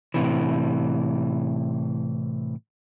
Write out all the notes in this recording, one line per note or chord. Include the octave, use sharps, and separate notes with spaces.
A2 C3 E3